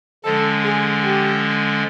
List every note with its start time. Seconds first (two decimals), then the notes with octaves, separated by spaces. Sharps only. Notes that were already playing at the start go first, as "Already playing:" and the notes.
0.24 D3 F3 G#3 C#4 A4
0.64 G#4
1.04 G4